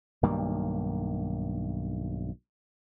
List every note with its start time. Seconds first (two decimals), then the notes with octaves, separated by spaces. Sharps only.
0.23 B1 G2 D#3 A#3